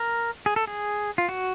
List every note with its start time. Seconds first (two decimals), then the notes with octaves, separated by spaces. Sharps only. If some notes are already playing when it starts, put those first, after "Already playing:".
Already playing: A#4
0.46 G#4
0.56 A4
0.67 G#4
1.18 F4
1.29 F#4